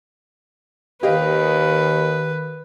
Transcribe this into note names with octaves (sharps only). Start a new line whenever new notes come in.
D#2 D#3 G4 B4 D#5 F5